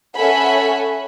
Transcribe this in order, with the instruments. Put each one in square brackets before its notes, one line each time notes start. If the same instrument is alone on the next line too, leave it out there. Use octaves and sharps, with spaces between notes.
[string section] C#4 A4 E5 F#5 G#5 B5